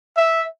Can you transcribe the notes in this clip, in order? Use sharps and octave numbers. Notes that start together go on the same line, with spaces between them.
E5